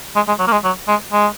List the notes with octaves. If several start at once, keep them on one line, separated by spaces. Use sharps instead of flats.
G#3
G#3
F#3
A#3
G#3
F#3
G#3
G#3